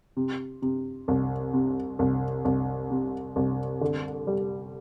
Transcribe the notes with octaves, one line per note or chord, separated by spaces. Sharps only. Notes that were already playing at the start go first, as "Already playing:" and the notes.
C3
C3
C2
C3
C2
C2
C3
C2
D3
G3